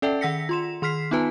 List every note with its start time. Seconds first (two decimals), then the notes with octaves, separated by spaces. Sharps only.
0.02 C#4 A4 D5 E5 G5 A5
0.21 D#3 F#5 E6 A#6 B6 C#7
0.49 F4 C6 E7
0.82 D#3 C6 F6 B6 C7
1.11 B3 D#4 F4 B4 G#5 A5